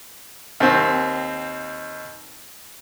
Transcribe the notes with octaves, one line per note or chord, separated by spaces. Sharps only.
D#2 C4